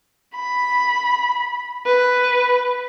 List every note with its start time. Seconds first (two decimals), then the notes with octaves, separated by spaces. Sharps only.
0.35 B5
1.86 B4